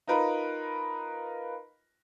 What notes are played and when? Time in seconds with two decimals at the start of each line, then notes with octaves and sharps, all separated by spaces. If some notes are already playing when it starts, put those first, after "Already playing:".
0.07 D#4 F4 A#4 B4